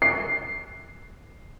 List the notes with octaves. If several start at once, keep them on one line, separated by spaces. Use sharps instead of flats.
C7